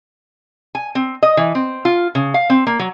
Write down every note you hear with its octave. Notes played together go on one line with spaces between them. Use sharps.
G#5
C4
D#5
E3
C4
F4
C#3
F5
C4
A#3
F#3